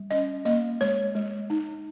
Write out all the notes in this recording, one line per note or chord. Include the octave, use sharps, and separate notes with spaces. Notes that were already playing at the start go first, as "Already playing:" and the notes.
Already playing: G3
C#4 D#5
A#3 D#5
G#3 C#5
G#3
D#4